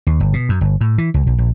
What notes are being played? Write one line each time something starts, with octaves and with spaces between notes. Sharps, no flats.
D#2
G1
B2
F#2
G1
A2
E3
C#2
B1
A#1